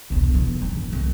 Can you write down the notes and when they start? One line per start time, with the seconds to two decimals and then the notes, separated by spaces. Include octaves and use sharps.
0.10 E1 C2
0.34 B1 E3
0.62 F#2
0.77 G#2
0.92 C2